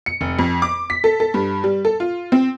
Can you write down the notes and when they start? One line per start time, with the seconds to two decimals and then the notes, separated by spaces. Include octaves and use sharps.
0.06 C#7
0.21 F1
0.39 F2
0.62 D6
0.90 B6
1.04 A4
1.20 A4
1.34 G2
1.64 G3
1.85 A4
2.00 F4
2.32 C4